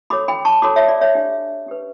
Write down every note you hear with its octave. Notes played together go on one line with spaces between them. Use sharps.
F#4 A4 C#5 B5 D6
G5 B5
A5 C#6
F#4 A4 C#5 B5 D6
C#5 E5
D5
C#5 E5
D4 G4 C#5
C#4 G4 B4